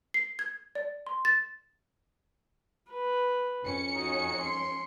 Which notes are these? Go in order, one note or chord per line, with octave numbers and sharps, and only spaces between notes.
C7
G#6
D5
C6
A6
B4
F2 C#4 C#7
D#4 F#4
C6